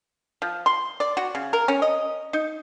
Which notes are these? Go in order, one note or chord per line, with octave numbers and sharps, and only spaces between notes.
F3
C6
D5
F#4
C#3
A#4
C#4
D#5
D#4